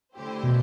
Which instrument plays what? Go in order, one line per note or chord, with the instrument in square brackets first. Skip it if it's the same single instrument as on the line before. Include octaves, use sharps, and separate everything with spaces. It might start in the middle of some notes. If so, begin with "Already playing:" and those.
[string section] D3 A3 E4 G4 C5
[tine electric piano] B2